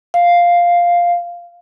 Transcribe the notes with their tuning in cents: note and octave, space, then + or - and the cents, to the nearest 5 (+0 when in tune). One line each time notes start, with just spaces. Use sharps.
F5 +0